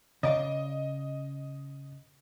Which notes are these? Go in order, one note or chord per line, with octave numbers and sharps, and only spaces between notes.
C#3 D5 D#5 F5